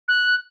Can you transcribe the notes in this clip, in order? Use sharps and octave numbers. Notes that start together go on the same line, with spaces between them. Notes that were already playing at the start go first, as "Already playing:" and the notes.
F#6